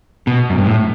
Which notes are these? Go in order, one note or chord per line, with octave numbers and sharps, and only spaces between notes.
B2
F#2
G2
A2